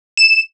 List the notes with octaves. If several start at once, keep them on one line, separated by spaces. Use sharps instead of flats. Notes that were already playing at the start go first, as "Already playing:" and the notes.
E7